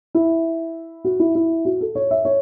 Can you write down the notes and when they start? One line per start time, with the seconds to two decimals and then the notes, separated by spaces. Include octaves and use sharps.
0.15 E4
1.05 F#4
1.20 E4
1.35 E4
1.65 F#4
1.81 A4
1.95 C#5
2.11 E5
2.25 C#5